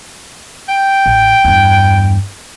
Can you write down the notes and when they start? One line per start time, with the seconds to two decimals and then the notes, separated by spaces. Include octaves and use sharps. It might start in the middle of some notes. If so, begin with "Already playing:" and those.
0.69 G5
1.06 A1
1.44 E2 G2